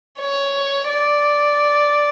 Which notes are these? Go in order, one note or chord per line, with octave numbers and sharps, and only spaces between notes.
C#5
D5